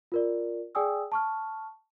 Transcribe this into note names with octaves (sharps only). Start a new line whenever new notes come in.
F4 A#4 D5
G#4 D5 G5 G#5 D#6 E6
A5 C#6 F6